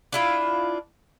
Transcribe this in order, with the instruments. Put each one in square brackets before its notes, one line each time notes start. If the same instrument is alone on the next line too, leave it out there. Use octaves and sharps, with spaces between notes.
[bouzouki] D4 E4 F4